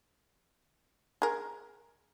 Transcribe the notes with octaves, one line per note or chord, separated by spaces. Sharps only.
G#4 A#4